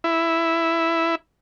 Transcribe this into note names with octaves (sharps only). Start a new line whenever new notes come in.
E4